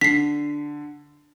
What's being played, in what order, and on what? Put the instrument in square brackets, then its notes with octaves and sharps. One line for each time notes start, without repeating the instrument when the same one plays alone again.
[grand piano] D3 [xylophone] B6 C7